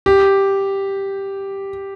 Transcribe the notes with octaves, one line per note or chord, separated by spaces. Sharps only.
G4